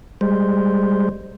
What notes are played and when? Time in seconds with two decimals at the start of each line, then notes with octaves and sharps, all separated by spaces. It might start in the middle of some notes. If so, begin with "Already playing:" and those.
0.21 G3 G#3 C5